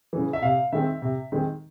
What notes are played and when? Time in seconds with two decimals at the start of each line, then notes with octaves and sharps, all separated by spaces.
0.13 C#3 E3
0.33 E5
0.42 C3 F5
0.72 D#3 G#3 C4 E5
1.02 C3
1.32 D#3 G#3 C4